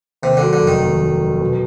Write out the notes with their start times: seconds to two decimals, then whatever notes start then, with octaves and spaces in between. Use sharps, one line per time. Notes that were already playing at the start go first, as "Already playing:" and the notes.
0.22 D#2 C3
0.37 D3
0.42 F#3
0.53 D3
0.62 F1
0.68 D#3
0.81 D#2
1.01 F#3
1.21 F#3
1.41 B2